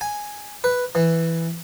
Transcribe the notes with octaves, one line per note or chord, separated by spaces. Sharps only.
G#5
B4
E3